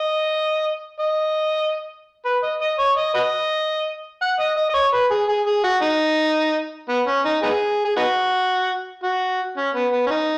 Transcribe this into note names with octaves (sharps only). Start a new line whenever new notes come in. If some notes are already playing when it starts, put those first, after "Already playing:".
Already playing: D#5
D#5
B4
D#5
D#5
C#5
D#5
F#4 B4 D#5
F#5
D#5
D#5
D#5
C#5
B4
G#4
G#4
G#4
F#4
D#4
B3
C#4
D#4
B3 D#4 G#4
G#4
B3 D#4 F#4
F#4
C#4
B3
B3
C#4
D#4